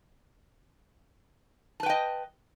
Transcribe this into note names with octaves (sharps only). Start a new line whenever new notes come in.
B4 D#5 G5 A5